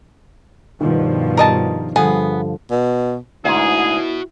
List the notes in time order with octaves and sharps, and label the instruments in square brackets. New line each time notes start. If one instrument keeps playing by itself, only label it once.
[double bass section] G2 B2 F3 [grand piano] D#3
[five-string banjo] A#4 D#5 A5
[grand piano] G2 D3 F3 [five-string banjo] B3 G#4
[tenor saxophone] B2
[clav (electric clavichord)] D2 G#2 [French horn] E4 [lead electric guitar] F#4 B4 [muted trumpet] G#4